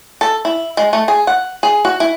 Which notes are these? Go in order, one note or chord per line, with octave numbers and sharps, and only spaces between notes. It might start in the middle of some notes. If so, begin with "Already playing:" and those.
A4
E4
G#3
A3
G#4
F#5
G#4
F#4
E4